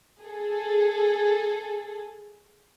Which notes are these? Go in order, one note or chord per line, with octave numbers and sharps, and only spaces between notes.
G#4 A4